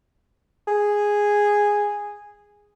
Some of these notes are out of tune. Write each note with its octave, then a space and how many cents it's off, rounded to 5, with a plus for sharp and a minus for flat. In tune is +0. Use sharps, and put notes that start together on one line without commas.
G#4 -5